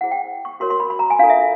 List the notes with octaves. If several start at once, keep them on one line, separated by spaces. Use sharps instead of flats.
E4 G#4 C5 F#5
G5
C#6
F#4 A#4 C#5 C6
C6
B5
B5
A#5
G#5
D4 F4 A4 F5
E5